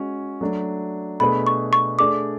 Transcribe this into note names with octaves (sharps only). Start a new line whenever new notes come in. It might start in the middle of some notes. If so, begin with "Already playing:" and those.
Already playing: G#3 C#4 F#4
F#3 A3 D4
B2 A3 D4 G#4 B4 B5
C#6
C#6
A3 D4 G#4 D5 D6